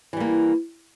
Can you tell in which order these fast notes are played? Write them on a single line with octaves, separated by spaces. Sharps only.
E3 G3 A#3